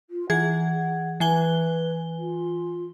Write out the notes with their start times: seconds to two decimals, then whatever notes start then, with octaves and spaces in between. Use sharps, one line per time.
0.10 F4
0.30 E3 G#4 F#5 G#6
1.20 E3 B4 G#5 G7
2.17 F4